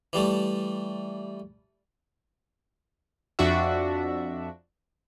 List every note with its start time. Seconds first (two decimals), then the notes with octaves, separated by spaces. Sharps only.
0.13 E3 G3 A3
3.39 F2 D4 F#4 E5